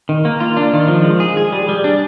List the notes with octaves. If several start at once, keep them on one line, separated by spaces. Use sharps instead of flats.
D#3
A#3
F4
D4
D#3
F3
G#3
G#4
G#4
G3
G3
D4